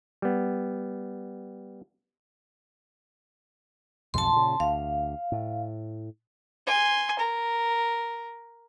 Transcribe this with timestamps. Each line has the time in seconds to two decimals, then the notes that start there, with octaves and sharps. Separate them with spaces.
0.22 G3 B3
4.14 B1 F2 G#2 A5 C6
4.33 A#2 C#3
4.60 D2 F5
5.32 A2
6.67 G#5 C6
7.19 A#4